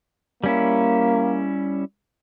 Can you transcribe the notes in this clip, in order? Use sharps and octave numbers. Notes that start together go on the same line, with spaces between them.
G3 A#3 C#4 E4